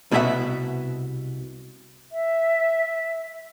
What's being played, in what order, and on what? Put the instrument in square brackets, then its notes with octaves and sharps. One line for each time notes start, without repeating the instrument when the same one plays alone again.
[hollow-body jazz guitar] C2 B2 B3 C#4 E5 F#5
[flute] E5